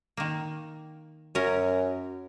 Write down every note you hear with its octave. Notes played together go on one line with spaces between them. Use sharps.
D#3 A#3
F#2 C#4 A#4